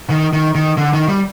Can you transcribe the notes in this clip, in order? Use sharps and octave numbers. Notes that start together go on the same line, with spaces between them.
D#3
D#3
D#3
D3
D#3
G3